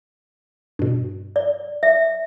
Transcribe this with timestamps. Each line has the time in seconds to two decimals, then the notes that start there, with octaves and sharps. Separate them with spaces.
0.79 G2 B2
1.36 D5
1.83 E5